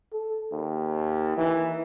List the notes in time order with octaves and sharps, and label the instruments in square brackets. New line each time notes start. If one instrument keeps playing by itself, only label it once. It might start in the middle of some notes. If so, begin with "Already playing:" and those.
[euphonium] A4
D#2
E3